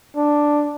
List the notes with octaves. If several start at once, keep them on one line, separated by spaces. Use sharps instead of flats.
D4